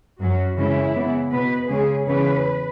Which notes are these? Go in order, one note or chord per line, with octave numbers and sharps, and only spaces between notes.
F#2 F#3 C#4 F#4
F#2 C#3 E3 G#3 C#4 E4
C#3 E3 B3
B2 B3 B4
C#3 G#3 C#4 G#4
E2 C#3 E3 C#4 B4